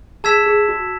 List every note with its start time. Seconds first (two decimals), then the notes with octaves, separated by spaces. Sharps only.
0.24 G#4 A5 E6 G#6 B6 E7
0.46 G#4
0.69 F#4